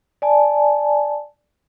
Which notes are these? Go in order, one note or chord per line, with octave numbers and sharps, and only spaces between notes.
D5 G#5 A5